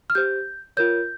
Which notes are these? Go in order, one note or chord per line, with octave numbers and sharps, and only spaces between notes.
F6
G4 C5 G6
F4 A#4 C#5 G6